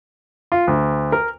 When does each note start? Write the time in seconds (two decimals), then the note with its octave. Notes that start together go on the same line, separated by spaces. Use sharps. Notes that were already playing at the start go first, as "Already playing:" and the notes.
0.52 F4
0.67 D2
1.12 A#4